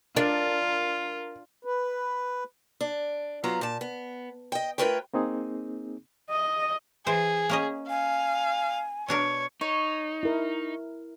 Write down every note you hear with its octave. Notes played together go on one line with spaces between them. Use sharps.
D4 F4 A#4
B4
D4
F#3 B3 F4 A#5
A#2 A5
B3
D#5 G5
A3 F4 A#4 B4 C#5 G5
A#3 C4 D#4 G#4
D#5
E3 G#4 C5
A#3 C#4 D#5
F5 G#5
B2 D4 A#4 C#5
D#4 C#5
E4 A#4